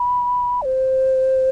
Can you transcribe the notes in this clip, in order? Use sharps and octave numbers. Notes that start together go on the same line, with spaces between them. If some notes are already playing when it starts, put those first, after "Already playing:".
Already playing: B5
D5
C5